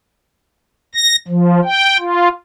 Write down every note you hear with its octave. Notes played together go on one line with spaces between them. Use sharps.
A#6
F3
G5
F4